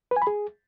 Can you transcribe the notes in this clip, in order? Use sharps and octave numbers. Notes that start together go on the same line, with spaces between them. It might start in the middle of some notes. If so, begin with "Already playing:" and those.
B4
G#5
B5
G#4